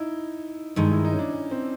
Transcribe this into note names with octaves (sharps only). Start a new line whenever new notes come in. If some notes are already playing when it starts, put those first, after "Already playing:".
Already playing: D#4 E4
G2 D#3 G#3 D#4
E4
D#4
C#4
D4
C#4
C4